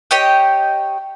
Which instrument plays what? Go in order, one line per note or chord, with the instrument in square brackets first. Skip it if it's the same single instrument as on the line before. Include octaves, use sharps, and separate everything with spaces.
[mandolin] G4 C#5 D#5 G5